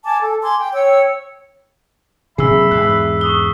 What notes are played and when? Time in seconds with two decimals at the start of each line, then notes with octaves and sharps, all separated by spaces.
0.05 G#5 A5 D6
0.22 A4
0.41 G#5 C6 D6
0.58 G5
0.73 C#5 G5 E6
2.38 C3 F#3 A#3 G#4 E5 B5 E6 C7
2.71 E2 G#2 F#6 B6 C7
3.21 C#6 D#6 G7